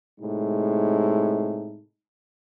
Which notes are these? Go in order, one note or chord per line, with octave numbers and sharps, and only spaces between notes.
A2 C3 G#3 D#4